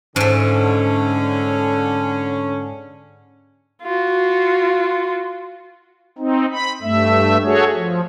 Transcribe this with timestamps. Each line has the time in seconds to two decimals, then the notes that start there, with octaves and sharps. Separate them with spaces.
0.16 G#2 D3 A3 C#4
3.82 F4 F#4
6.19 C4 D#4
6.52 B5
6.82 G2 A3 E5
7.44 F#4 G#4 A4 C#5
7.75 F3